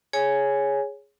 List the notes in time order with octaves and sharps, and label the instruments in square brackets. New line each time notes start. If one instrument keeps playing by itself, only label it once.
[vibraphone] G#4 C#5 G#5